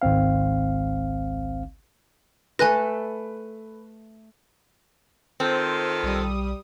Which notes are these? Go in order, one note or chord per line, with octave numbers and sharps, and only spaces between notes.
G#1 C#2 C4 F5
A3 A4 B4 G#5 F#6 A#6
D#3 C4 F4 A4 C5
B1 G3 D#6